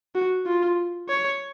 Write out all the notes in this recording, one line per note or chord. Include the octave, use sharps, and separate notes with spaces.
F#4
F4
C#5